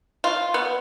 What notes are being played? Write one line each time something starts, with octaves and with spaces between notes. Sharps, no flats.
F4
B3